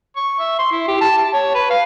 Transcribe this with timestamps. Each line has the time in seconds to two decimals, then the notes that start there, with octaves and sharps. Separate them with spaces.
0.16 C#6
0.39 E5
0.59 C6
0.72 E4
0.88 G4
1.01 A5
1.17 A5
1.33 C#5
1.54 B4
1.70 F5